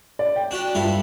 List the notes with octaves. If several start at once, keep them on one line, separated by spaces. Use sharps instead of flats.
D5
G5
D4 F#4 G4
G2 E4 F4 A4